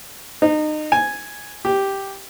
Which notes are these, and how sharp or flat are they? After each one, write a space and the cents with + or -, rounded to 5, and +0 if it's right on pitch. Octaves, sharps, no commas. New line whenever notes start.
D#4 -30
G#5 +0
G4 +0